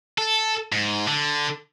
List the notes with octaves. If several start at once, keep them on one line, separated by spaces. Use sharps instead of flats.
A4
G#2
D3